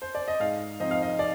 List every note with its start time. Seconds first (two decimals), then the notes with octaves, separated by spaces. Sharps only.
0.02 C5
0.15 D5
0.28 D#5
0.40 G#2 F5
0.80 F3 C4 D#4 D#5
0.91 F5
1.02 D#5
1.19 D5